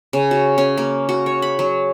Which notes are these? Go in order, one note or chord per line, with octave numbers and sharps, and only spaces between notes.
C#3
F#4
C#4
A#3
F#4
C#5
B5
F#3